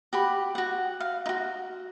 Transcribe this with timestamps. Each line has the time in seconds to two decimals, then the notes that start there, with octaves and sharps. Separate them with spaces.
0.13 F#4 G4 B5
0.55 F#4 F#5
1.00 F5
1.26 D#4 F#4